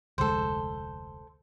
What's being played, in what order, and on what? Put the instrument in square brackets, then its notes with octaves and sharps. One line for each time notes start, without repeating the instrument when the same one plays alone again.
[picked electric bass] F1 D2 G#3 [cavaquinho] A4 C5